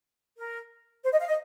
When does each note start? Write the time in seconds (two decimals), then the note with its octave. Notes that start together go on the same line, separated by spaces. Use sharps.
0.38 A#4
1.04 C5
1.12 D#5
1.21 F5
1.28 D#5